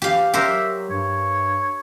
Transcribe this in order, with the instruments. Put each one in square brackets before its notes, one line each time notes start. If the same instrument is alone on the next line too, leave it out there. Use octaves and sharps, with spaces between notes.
[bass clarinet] E3 [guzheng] G4 F5
[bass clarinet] F#3 [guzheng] G4 A#4 C5 [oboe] E5
[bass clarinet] G2 [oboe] C#5